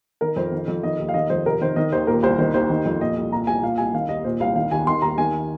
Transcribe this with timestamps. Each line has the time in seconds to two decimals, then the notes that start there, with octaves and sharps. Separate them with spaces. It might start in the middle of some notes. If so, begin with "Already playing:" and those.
0.21 D#3 A#4
0.36 F2 C5
0.52 D#3
0.68 F2
0.83 D#3 D#5
0.99 D#2
1.09 F5
1.14 D#3 D#5
1.30 F2 C5
1.46 C3 A#4
1.61 D#3 C5
1.76 D#3 D#5
1.92 D#2 C5
2.07 A#2 A#4
2.23 C2 C5
2.39 D#3 C5
2.54 D#2 C5
2.70 D#3
2.86 F2
3.01 A#2 D#5
3.17 C2
3.32 A#2 A#5
3.47 C2 G#5
3.63 A#2 F5
3.78 C2 G#5
3.93 D#3 F5
4.09 D#2 D#5
4.24 A#2 C5
4.40 C2 F5
4.55 D#3 F5
4.71 D#2 G#5
4.87 D#3 C6
5.02 D#2 A#5
5.18 D#3 G#5